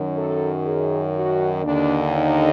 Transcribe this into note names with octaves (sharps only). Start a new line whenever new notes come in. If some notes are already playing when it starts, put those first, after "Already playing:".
Already playing: F#2 D#3
A4
G#4
F#4
D#2 D3 D4
D#4